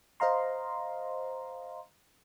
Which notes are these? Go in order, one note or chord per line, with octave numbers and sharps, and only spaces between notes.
C5 D#5 F5 A#5 C6